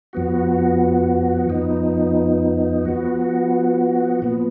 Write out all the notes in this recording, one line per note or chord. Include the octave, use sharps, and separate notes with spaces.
F2 F3 B3 F#4
F2 F3 B3 D#4
F3 B3 F#4
A#2 F3 B3